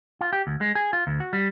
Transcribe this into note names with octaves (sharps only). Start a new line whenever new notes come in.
F4
G4
D2
G#3
G#4
F4
D2
F#4
G3